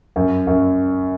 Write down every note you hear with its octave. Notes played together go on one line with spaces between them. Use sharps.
F#2
F#2